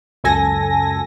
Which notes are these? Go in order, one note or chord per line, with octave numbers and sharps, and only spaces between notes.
C#2 F#2 A4 G#5 A#6